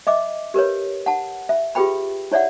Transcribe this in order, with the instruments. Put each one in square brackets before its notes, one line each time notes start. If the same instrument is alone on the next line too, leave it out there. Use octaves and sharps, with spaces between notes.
[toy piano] D#5 E5 D6
G4 A#4 B4 C#5
F#5 A5
E5
F4 G4 G#4 B4 G5 B5
E4 C#5 D5 E5 F#5